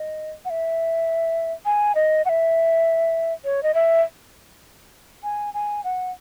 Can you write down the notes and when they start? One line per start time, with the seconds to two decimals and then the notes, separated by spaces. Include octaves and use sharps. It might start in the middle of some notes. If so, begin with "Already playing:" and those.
Already playing: D#5
0.45 F#5
0.50 E5
1.65 G#5
1.95 D#5
2.25 F#5
2.29 E5
3.45 C#5
3.63 D#5
3.74 E5
5.23 G#5
5.54 G#5
5.84 F#5